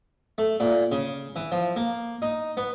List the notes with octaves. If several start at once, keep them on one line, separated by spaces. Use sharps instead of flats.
A3
A#2
C#3
E3
F3
A#3
D#4
B3